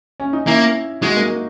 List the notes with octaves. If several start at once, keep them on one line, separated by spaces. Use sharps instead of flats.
C#4
D#4
A#3 C#4 E4
G#3 D#4 F#4
A#3
A#3